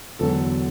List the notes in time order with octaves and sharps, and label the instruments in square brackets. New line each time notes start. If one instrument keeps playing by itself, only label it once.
[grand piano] E1 E2 D3 F#3 A4